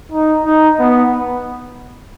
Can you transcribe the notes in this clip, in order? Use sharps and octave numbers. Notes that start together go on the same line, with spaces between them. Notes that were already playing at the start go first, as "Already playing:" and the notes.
D#4
D#4
B3